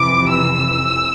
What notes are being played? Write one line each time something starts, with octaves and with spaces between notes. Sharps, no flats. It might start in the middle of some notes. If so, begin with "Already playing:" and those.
Already playing: F2 C3 E3 D6
E6